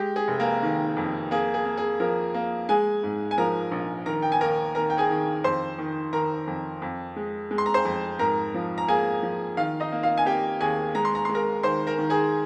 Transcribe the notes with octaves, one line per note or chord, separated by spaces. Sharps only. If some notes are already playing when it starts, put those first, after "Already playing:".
Already playing: G#3 G4
G#4
F1
A#3 A#4
D#3
F2
A#3 G#4
G#4
A#3
G#4
F3 A#3 A#4
A#3
G#3 G#4 G#5
G#2
G#5
F3 A#4 A#5
A#1
D#3 A#4 A#5
G5
G#5
D#2 A#4 A#5
D#3 A#4 A#5
G5
G#4 G#5
D#3
F2 C5 C6
D#3
D#3 A#4 A#5
F2
F2
G#3
G#3
C6
A#5
C5 C6
F2
G#2 A#4 A#5
F3
A#5
A#3 G#4 G#5
F3
D#3 F4 F5
D#4 D#5
A#3
F4 F5
G#5
A#3 G4 G5
D#2 G#4 G#5
G#3 A#5
C6
A#5
G#3 C6
A#4 A#5
D#3 C5 C6
A#4 A#5
D#3
G#4 G#5